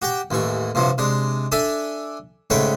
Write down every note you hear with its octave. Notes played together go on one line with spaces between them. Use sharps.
F#4 G4 G5
A1 D#2 E3 C#6
G2 C3 F3 F#3
C3 G#3 D4
D4 A4 D5 E5 G#5
G#2 C#3 A3 B4 C#5 G5